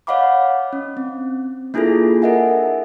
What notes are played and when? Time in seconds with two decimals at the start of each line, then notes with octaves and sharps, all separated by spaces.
0.07 C#5 D#5 F5 F#5 B5 D6
0.73 C#4
0.97 C4
1.74 A#3 D4 E4 F4 G#4 A4
2.22 A4 A#4 D#5 E5 F#5 G#5